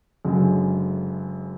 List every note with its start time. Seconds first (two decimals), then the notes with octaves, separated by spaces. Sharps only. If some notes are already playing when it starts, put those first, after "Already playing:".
0.25 F#1 F#2 D3 G#3